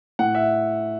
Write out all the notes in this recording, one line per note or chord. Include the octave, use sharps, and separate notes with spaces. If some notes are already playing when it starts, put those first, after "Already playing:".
A2 F#5
E5